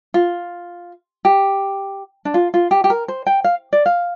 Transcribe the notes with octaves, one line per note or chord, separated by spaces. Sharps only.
F4
G4
D4
F4
F4
G4
G4
A#4
C5
G5
F5
D5
F5